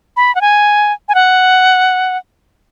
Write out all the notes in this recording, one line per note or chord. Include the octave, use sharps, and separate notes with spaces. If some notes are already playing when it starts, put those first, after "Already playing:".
B5
F#5
G#5
G#5
F#5